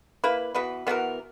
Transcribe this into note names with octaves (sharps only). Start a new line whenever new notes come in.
A#3 E4 B4
E3 B3 F#4 B4
E3 B3 F#4 A#4